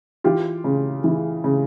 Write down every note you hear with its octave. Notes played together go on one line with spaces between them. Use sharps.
E3 F4 G4
C#3
E3
C#3